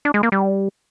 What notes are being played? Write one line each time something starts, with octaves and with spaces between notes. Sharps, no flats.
D4
G#3
A#3
G3